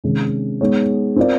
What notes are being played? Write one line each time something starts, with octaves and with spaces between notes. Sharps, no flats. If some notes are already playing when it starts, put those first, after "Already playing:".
C3 D#3 G#3 C#4
G#3 B3 D#4 G#4 C#5
C4 F4 A#4 D5